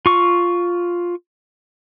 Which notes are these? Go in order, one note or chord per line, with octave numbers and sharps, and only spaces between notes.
F4 C#6